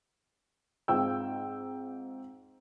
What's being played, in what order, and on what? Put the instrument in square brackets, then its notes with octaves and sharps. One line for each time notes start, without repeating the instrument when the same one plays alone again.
[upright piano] G#2 C4 F4 C5 G5 E6